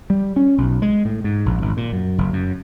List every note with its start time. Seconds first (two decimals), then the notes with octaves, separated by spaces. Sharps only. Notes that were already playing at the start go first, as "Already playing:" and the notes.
0.10 G3
0.36 C#4
0.58 B1
0.82 G#3
1.05 A2
1.24 G#2
1.46 A#1
1.62 G#1
1.77 A#2
1.92 F#2
2.18 F#1
2.33 F#2